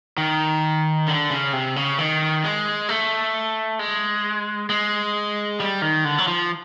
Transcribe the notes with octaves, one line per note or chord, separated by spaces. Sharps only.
D#3
D3
C#3
C3
C#3
D#3
G#3
A3
G#3
G#3
G3
D#3
D3
F#3
F3